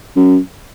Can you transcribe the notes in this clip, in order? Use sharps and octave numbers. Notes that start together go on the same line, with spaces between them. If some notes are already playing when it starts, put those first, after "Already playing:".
F#2